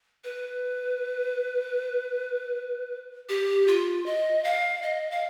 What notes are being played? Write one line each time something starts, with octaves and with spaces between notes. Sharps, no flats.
B4
G4
F4
D#5
F5
D#5
F5